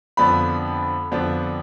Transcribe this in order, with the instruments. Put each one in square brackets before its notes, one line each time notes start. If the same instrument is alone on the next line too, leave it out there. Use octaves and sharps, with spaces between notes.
[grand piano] F2 D3 F3 B3 D4 B5
F2 D3 F3 B3 D4